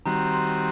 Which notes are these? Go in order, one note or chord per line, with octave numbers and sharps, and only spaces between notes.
D#3 G3 C4 F#4 A#5
A#5
C6